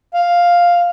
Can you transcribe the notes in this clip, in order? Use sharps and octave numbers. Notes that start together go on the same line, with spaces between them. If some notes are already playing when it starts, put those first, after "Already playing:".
F5